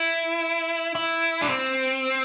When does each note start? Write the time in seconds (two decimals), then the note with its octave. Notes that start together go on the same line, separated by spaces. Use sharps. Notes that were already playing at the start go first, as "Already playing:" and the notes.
Already playing: E4
0.95 E4
1.42 D4
1.48 C4